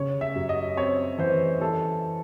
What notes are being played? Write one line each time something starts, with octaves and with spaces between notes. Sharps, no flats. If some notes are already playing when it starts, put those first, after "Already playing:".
Already playing: C#3 C#5
E5
F#2
D#5
C4 C#5
E3 C5
E3 A4